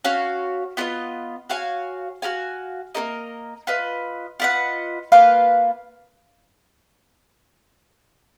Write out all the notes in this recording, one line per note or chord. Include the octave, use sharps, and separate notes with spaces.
C#4 F#4 C#5 F5
B3 F4 B4 D#5
F#4 C#5 F5 G#5
F#4 A#4 F5 G#5
A#3 D#4 A#4 D#5
F4 B4 D#5
F4 B4 D#5 F#5
A#3 F4 B4 F5